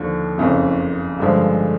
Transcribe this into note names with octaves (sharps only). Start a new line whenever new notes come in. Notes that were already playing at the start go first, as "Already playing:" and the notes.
Already playing: D#2 D3 F3
F#1 F2 C#3
G2 D3 F3 G#3